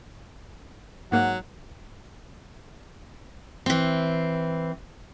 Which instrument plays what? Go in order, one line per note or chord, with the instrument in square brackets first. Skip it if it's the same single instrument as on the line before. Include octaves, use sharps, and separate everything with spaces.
[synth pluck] G#2 A#3 [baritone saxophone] F#3 [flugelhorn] F#5
[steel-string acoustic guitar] E3 C4